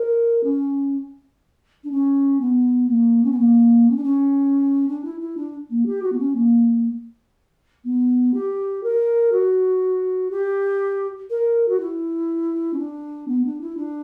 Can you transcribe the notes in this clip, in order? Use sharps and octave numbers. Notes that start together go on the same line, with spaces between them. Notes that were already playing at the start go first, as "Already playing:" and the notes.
Already playing: A#4
C#4
D4
C#4
B3
A#3
C#4
B3
A#3
C#4
D4
C#4
D4
E4
E4
D4
A#3
G4
F#4
B3
C#4
A#3
B3
G4
A#4
F#4
G4
A#4
F#4
E4
C#4
D4
B3
D4
E4
D4